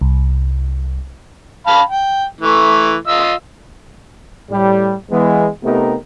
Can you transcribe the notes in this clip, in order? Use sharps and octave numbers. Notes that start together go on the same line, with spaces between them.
C2
F5 A5 B5
G5
E3 A3
F4 D#5 E6
A2 G3
E3 G#3 B3
C3 A3 B3 D#4 G4 A#4